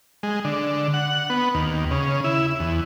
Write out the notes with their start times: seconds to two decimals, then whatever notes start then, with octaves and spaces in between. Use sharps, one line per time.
0.23 G#3
0.45 D3
0.94 F#5
1.30 B3
1.55 D#2
1.91 C#3
2.24 E4
2.60 E2